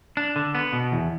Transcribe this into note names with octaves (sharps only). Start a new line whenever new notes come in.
D4
D3
B3
B2
E2